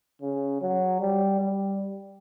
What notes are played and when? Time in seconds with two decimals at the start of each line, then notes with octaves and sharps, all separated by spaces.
0.22 C#3
0.62 F#3
1.00 G3
1.40 G3